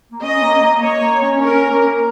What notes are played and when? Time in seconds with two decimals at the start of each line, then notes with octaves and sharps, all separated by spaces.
0.12 A#3
0.22 C#4 D#5
0.42 A#3
0.62 A#3
0.81 A#3 C#5
1.02 A#3
1.22 C#4
1.41 C#4 A#4
1.71 A#3